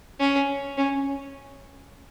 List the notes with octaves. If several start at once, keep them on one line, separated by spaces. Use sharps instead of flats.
C#4
C#4